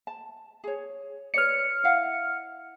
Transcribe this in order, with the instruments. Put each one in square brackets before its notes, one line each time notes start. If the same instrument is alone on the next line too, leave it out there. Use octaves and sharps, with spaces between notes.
[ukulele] A5
G#4 C#5
[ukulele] B4 C#5 D5 [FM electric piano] F6 C#7
[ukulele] E4 F5 F#5